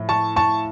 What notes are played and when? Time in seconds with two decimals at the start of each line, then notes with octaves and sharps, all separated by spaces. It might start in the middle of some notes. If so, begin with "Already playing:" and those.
Already playing: A2 F3
0.09 A5 C#6
0.36 A5 C#6